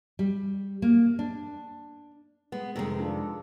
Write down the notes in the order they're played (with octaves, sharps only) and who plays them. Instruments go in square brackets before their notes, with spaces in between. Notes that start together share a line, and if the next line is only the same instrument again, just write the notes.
[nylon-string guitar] G3
A#3
D4
[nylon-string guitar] G#3 [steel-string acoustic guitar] B3
[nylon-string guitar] F2 G#3 [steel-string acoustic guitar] C3 D#3
[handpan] D4 F4 A4